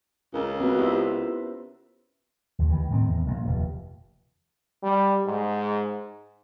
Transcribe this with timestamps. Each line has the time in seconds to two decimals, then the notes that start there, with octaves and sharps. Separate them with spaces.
0.34 C#2 C#4 A#4
0.60 B3 C4 F#4 B4
0.78 E4 F4 G4 C5 E5
2.59 D#2
2.70 D2 D#3 E3
2.90 A2 D#3 A3 C4
3.07 E2
3.26 A#1
3.44 F1 D#2
4.83 G3
5.25 G#2